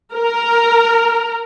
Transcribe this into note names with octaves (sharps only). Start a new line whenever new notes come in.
A#4